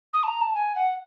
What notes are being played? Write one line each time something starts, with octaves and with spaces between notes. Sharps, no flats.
D#6
A5
A#5
A5
G#5
F#5